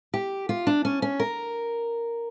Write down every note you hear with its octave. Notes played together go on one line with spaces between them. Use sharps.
G4
F4
D4
C#4
C#4
A#4